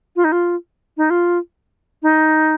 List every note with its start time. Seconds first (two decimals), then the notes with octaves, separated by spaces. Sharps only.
0.16 F4
0.24 D#4
0.32 F4
0.97 D#4
1.10 F4
2.03 D#4